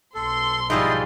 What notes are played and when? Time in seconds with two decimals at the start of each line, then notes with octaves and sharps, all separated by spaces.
0.15 B1 A4 C6
0.70 G#2 F3 G3 E4 D#5